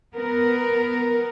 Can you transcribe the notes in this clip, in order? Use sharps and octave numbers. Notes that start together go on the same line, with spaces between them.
B3 A#4